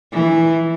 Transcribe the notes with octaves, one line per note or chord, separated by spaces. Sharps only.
E3